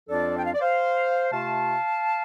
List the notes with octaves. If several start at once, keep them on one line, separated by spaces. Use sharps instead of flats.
F2 F3 D4 F4 A4 D5
G5
F5
D5
C5 F5
C3 A3 F4 F5 A5